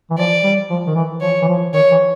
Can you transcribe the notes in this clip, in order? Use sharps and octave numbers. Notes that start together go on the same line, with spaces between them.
E3
F3 D5
G3
F3
D#3
E3
F3 C#5
E3
F3
D#3 C#5
E3